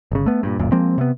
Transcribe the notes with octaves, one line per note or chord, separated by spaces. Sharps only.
G1 C#3
A3 B3
G2 A#2
D1 F#2 A#2
F3 G#3 A#3 C4
C3 B3